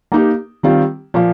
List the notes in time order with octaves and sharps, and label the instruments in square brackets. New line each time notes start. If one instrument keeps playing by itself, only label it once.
[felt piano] A#3 D#4 G4
D#3 G3 C4 F4
A#2 F3 A#3 F4